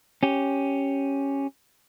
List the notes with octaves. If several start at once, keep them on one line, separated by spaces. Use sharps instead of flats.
C#4 G4